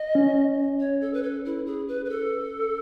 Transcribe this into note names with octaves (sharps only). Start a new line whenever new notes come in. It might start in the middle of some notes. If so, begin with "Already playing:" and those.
Already playing: D#5
C#4
C#5
A4
B4
A4
E4
G#4
B4
B4
A4